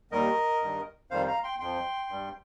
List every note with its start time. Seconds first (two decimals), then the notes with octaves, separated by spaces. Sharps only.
0.11 D#2 D#3 G3 A#4 D#5
0.61 G2 D#3 G3
1.11 F2 D#3 G3 C5 F5
1.27 F5 A#5
1.43 G5 C6
1.60 F2 F3 G5 C6
2.10 G2 G3